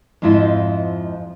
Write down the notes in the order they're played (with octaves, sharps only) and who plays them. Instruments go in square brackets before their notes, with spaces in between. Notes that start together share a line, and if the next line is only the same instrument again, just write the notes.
[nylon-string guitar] F2 G#2 F3 E4 F4 D#5